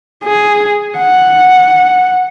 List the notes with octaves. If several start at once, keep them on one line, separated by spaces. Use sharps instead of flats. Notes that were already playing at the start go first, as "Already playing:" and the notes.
G#4
F#5